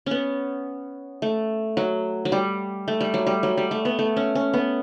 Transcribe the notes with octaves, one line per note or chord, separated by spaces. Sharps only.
B3 C#4
A3
F#3
F#3
G3
A3
G3
F#3
G3
F#3
G3
A3
B3
A3
C#4
C#4
B3